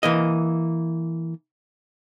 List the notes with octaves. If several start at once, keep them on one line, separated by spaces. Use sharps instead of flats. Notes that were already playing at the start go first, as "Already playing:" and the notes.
E3 A#3 D#5